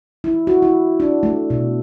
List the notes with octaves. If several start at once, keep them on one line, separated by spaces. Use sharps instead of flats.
E4
F#4
E4
D4
A3
B2